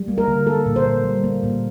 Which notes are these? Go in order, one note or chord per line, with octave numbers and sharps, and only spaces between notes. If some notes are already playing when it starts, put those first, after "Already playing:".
Already playing: G3
A#3
A#4
D3
A#3 A4
A#2
C5
A#2
G3
A#3
A#2